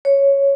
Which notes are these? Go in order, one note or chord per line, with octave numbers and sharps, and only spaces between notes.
C#5